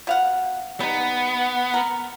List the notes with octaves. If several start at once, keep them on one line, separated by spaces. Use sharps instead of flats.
B2 F5 F#5
G3 B3 D#4
A#4